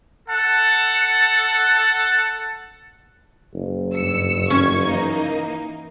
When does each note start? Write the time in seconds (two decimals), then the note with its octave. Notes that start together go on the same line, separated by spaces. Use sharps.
0.29 A4 F#5 A5
3.54 F#1
3.94 G2 E6 C#7
4.50 C#4 C#6 G#6
4.87 E3 A#3 D#4